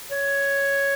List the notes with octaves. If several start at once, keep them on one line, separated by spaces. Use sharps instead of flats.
C#5